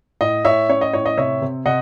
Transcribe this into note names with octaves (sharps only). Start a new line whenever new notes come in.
A2 D#5
A2 C#5 E5
C#4 C#5
D#5
A2 C#5
D#5
C3 C#5 E5
C3
C3 D#5 F#5